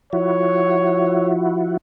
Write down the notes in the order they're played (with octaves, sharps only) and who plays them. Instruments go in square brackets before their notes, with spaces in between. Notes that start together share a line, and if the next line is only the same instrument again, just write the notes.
[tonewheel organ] F3 E4 F#4 [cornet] C#5